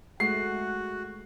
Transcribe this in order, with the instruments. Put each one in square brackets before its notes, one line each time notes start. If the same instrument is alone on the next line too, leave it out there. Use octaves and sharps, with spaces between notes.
[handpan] G#3 A3 [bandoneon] F#4 [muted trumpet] F#5 [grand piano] C7